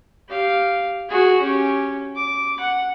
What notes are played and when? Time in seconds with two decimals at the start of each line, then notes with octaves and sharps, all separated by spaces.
0.28 G4 F5
1.09 F#4 G#4
1.42 C#4 G4
2.15 D6
2.60 F#5